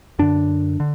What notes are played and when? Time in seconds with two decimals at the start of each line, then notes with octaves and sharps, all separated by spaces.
0.19 F#2 D3 D4
0.80 D3